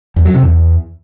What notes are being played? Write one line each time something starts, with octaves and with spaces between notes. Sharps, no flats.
E2
F#3
C3
E2